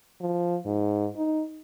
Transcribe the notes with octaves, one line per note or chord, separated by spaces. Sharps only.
F3
G#2
D#4